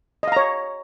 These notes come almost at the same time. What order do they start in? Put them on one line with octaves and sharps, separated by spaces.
D#5 F5 A#5 C#5